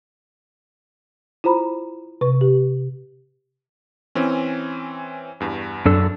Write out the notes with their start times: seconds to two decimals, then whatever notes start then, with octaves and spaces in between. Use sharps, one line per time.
1.44 E4 F4 C5 A#5 B5
2.21 C3 B4 C#6
2.41 G4
4.15 E3 C4 C#4
5.40 E2 G2
5.86 F#2 D4 A4